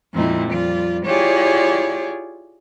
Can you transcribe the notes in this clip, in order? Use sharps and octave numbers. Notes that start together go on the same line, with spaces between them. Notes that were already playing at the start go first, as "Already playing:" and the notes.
F2 A#2 G#3 C4 D#4 E4
F2 G3 F4 D5
E4 F4 G4 G#4 C#5 D5